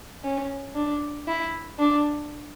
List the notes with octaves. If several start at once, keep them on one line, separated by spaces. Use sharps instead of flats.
C#4
D4
E4
D4